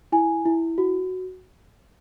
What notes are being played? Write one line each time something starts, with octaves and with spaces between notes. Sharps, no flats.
E4 G#5
E4
F#4